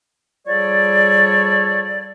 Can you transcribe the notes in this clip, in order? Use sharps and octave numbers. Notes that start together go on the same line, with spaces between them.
F3 G3 G#4 A4 C#5 D5